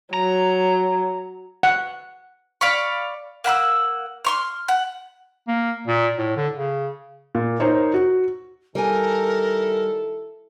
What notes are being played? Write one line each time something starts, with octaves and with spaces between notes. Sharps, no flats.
F#3 A#5
F#5
D5 F5 B5 C#6
A#3 F#5 B5 E6
C6 C#6 F6
F#5
A#3
A#2
A2
D3
C#3
A#2
D#4 A#4 C5 C#5
F#4
D#3 G3 E4 A4 A#4 G#5